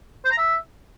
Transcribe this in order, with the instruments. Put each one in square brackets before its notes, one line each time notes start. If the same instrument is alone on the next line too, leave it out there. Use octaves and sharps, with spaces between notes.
[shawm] C5
A#5
E5